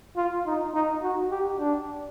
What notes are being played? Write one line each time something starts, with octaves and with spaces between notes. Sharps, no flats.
F4
D#4
D#4
F#4
G4
D4